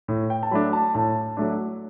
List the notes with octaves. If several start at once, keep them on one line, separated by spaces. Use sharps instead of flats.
A2
G5
A5
F#3 A3 D4 B5
A5
A2 A5
F#3 A3 D4